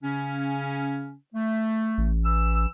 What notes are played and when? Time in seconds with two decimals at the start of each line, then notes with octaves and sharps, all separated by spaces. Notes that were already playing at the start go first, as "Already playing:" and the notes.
0.03 C#3 C#4
1.34 A3
1.98 A1
2.24 E3 E6